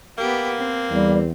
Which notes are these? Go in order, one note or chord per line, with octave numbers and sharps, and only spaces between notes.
A#3 B3 G4
C4
E2 G3